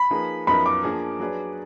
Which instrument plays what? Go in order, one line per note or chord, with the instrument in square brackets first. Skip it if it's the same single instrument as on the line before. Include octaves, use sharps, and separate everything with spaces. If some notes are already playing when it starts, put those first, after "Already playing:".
Already playing: [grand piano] B5
[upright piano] F3 A#3 D#4 G#4 B4
[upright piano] F#2 F3 B3 D#4 A#4 [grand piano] B5
[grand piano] D6
[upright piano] F3 A#3 D4 G#4
F#3 D4 G#4 B4 D5